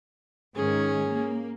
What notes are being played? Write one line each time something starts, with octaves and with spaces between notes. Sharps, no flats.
G#2 D#3 C#4 G#4
A#3